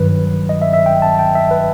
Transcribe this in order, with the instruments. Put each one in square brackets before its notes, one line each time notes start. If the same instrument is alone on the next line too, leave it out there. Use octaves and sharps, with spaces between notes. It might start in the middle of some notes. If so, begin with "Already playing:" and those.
Already playing: [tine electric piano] G2 D#3 F#3 B4
D#5
E5
E5
G5
A5
G5
E5
B4